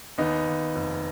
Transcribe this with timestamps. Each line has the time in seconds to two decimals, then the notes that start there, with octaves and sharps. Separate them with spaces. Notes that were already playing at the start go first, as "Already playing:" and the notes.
0.18 D#2 B3 D#4
0.47 D#2
0.75 F1